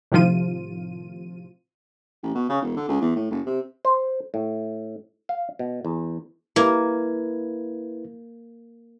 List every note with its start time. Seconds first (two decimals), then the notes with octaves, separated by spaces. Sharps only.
0.12 A2 C3 D#3 F3 F4 D#7
2.23 A1
2.35 B2
2.49 C#3
2.62 E1
2.76 D3
2.88 C#2
3.01 E2
3.16 A2
3.31 F#1
3.46 C3
3.85 C5
4.34 A2
5.29 F5
5.59 B2
5.85 E2
6.56 A#3 E4 B4 G#6